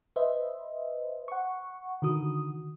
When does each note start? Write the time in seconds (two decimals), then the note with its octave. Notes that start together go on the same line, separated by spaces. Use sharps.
0.16 B4 C5 D#5 E5
1.28 F#5 C#6
2.02 D3 D#3 F#4 D#6